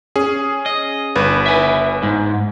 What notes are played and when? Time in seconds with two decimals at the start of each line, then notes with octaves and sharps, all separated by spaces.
0.16 C#4 G#4
0.66 D#5
1.16 G1 B4
1.46 E5 G#5
2.03 G#2